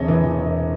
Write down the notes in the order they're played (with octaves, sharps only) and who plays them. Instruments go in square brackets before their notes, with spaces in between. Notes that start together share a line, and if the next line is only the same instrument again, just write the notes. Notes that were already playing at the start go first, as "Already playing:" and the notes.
Already playing: [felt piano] E1 C3 C#5 D#5
E3
E3
E1